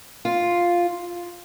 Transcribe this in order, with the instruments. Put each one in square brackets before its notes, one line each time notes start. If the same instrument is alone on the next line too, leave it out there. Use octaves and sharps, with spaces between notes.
[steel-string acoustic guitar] F4